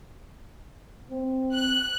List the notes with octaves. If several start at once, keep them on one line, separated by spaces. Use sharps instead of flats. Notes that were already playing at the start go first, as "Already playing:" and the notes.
C4
F#6